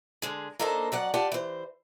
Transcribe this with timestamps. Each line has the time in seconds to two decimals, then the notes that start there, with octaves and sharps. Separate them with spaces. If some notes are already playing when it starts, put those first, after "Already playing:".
0.22 D3 G#3 G#4
0.59 A#3 D4 D#4 A4 A#4 C5
0.92 F2 F#3 D5 F#5
1.14 F4 G4 D5 F#5 A5
1.32 E3 C5